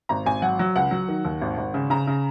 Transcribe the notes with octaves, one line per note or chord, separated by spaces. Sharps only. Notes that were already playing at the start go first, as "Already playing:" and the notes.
G#1 A#5
G#1 G#5
F#3 F#5
F#3
C#2 F#5
F#3
D#3
D#2
G#1
G#1
C#3
C#3 A#5
C#3